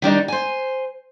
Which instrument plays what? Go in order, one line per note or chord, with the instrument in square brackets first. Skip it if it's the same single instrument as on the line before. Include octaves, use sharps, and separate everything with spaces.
[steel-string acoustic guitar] D#3 G3 D4 D#4
C5 G#5